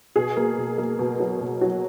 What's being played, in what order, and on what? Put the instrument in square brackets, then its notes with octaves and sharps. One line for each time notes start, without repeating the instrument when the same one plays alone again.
[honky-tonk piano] B2 G#4
A#3
B2
A#3
B2
F#3
B2
F#3